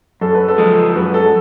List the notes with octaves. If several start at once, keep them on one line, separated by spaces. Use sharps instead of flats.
F#2 A4
B4
A4
F3 G#3
F#2 B4
A4